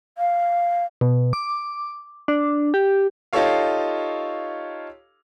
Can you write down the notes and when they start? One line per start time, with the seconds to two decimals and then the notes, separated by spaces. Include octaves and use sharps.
0.18 F5
1.01 B2
1.33 D6
2.28 D4
2.74 G4
3.33 D#4 F4 G4 A4 C#5 F5